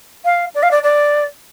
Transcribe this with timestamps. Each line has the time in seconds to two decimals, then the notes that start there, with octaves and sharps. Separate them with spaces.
0.25 F5
0.54 D5
0.62 F5
0.71 D5
0.83 D5